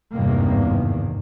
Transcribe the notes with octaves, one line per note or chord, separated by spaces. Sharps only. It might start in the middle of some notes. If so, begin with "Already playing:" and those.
G#1 E2 G2 C3 D#3 A#3